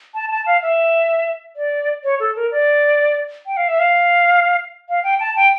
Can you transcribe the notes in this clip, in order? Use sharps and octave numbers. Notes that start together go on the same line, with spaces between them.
A5
A5
F5
E5
D5
C#5
A4
A#4
D5
G5
F5
E5
F5
F5
G5
A5
G5